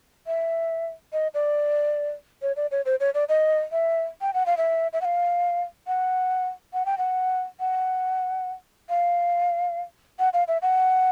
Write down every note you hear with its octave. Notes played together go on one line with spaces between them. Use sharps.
E5
D#5
D5
C#5
D5
C#5
C5
C#5
D5
D#5
E5
G5
F#5
F5
E5
E5
F#5
F5
F#5
F#5
G5
F#5
F#5
F5
F#5
F5
E5
F#5